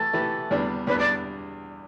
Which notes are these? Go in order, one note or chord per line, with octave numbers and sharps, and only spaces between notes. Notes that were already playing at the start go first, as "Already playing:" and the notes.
Already playing: E3 A3 G4 A4 B4
E3 A3 G4 B4
E2 D3 G3 B3 D4
E2 D3 G3 B3 D4 B4
D5